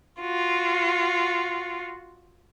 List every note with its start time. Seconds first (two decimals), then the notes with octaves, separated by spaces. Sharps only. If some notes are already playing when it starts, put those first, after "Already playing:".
0.21 F4 F#4